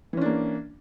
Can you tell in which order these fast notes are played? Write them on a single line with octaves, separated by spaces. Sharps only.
E3 C#4 D4 A#3